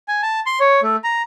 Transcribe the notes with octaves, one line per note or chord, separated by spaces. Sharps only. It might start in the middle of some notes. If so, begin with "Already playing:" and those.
G#5
A5
C6
C#5
A3
A#5